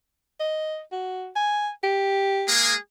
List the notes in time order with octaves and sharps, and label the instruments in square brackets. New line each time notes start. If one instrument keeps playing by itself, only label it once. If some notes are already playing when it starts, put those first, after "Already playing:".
[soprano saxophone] D#5
F#4
G#5
G4
[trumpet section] G#3 A#3 G#4